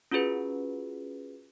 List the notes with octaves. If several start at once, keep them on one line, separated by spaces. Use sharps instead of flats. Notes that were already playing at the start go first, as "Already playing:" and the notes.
C#4 F4 F#4 G#4 B4